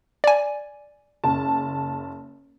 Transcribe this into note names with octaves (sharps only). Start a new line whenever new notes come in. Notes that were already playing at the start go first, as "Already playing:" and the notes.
D5 G#5
F#1 A5